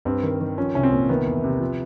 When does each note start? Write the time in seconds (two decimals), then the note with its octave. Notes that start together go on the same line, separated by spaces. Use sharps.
0.05 G2 C4
0.23 D#3
0.41 D#3
0.58 F3 C#4
0.75 C2 C#4
0.83 C4
0.92 A#2
1.09 D#3 B3
1.27 E2
1.44 C3
1.60 F3